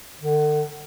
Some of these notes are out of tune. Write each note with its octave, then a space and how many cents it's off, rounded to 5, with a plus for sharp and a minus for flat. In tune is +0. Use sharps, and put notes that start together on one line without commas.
D3 +35